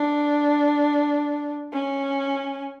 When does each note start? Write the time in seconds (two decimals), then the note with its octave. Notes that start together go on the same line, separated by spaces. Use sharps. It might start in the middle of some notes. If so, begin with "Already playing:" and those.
Already playing: D4
1.73 C#4